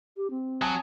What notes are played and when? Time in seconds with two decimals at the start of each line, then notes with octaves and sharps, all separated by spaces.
0.17 G4
0.30 C4
0.62 F#3 G#5 A5 D#6